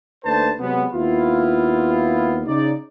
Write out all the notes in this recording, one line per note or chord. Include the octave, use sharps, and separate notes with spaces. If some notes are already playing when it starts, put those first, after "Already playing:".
D#2 A3 D4 B4 C5 A5
C3 F#3 G#3 B3
D#2 B3 E4 F4
C#3 D#4 D5